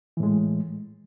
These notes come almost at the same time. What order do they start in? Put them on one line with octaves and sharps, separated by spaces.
E3 A2 G#3